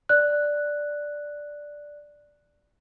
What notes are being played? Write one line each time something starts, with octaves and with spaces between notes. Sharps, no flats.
D5 F#6